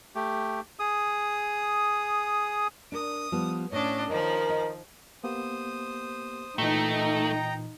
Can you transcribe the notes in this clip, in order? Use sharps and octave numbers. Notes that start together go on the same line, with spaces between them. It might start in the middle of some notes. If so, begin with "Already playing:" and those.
A3 G4
G#4 D#6
D4 A#4 D#6
F3 G3 B3
A2 C#4 D4 C#5 D#5
D#3 F3 C#4 A#4 C#5 D#5
D#5
A#3 B3 G4 C5 D#6
A#2 E3 A3 D#4 G5 A#5